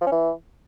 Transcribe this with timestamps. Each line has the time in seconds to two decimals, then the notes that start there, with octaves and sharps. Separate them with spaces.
0.01 F3
0.06 C#4
0.12 E3